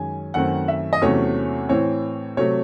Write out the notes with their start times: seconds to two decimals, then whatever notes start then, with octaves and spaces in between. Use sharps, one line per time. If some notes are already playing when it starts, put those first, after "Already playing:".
Already playing: F#2 D#3 G#3 C#4 G#5
0.34 F#2 D#3 A3 C4 F#5
0.68 E5
0.93 D#5
1.01 E2 C3 F#3 A3 C#4 C#5
1.69 A2 E3 C4 C#5
2.37 C3 F#3 A3 C#5